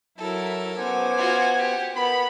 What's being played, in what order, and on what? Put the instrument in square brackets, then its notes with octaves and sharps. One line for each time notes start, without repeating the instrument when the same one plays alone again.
[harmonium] F#3 [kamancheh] E4 [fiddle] A4 A#4
[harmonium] B3 C5 [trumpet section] C#4 D6 [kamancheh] F#5 G#5
[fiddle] F4 F#4
G4
[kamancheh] B3 [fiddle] A#4 [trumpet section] B5